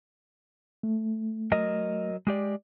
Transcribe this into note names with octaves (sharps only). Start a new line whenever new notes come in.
A3
F#3 A#4 D#5
G#3 G4 D5